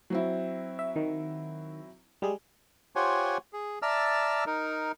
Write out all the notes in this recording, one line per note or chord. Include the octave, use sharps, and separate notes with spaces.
F#3 C4 E4
E5
D#3
G3 G#3 G#4
F4 G4 C5 C#5 F#5 G#5
G#4
D5 E5 A5 A#5 E6 F6
D#4 A#4